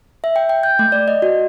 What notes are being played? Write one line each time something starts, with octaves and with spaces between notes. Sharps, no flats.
E5
G5
G5
G6
A3
D5
D#5
F#4